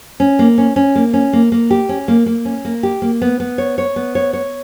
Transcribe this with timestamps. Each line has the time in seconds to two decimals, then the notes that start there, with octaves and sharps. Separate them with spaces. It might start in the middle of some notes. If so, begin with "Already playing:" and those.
0.20 C#4
0.39 A#3
0.58 C#4
0.76 C#4
0.95 A#3
1.14 C#4
1.33 A#3
1.52 A#3
1.70 G4
1.89 C#4
2.08 A#3
2.26 A#3
2.45 C#4
2.65 A#3
2.83 G4
3.02 A#3
3.21 B3
3.40 B3
3.58 C#5
3.78 C#5
3.96 B3
4.15 C#5
4.33 C#5